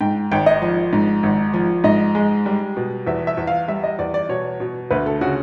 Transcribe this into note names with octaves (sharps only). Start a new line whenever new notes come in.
G#2 G5
G#1 G5
D#5
F3
G#2
G#1
F3
G#2 D#5
G#3
G3
B2
E2 E5
E5
E2
F5
G3 E5
D#5
E2 D5
D5
B2 C#5
B2
D2 B4
A4
C#3 F#4